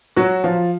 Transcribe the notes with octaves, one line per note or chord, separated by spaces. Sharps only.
F#3 F#4
F3 F4